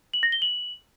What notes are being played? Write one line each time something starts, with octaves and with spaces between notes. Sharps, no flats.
F#7
A#6
G7
F#7